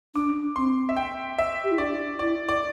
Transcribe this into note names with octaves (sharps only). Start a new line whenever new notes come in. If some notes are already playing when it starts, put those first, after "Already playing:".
D4 D6
C4 C6
E5
G5
E5
G4
E4
D4 D5
E4 D5
D5